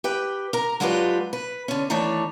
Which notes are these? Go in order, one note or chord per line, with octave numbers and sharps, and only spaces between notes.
G4 B4 G5
A#4 A#5
F#3 G#3 D4 F4 G4 B4
B4
D3 C#4
D#3 E3 A3 D4 C#5 D5